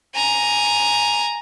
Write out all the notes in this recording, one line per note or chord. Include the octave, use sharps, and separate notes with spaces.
G#5 A#5